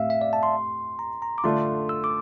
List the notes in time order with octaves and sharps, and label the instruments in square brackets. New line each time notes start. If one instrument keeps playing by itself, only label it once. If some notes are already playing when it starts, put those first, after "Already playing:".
Already playing: [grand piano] A2 C4 G4 [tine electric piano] E5 F5 E6
[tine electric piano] E5
D5
A5
C6
A#5
A#5
D6
[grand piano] D3 A3 D4 F4 [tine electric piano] C6
[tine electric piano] E6
D6